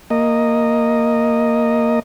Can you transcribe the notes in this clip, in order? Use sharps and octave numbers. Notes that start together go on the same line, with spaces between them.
A#3 D#5